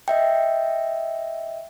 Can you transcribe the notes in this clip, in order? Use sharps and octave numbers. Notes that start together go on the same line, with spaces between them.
D#5 E5 G5